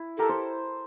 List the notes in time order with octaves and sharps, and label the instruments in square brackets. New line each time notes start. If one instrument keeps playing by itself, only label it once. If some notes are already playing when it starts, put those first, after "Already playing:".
Already playing: [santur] E4
[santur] G4 A#4 [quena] A4
[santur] A4 C5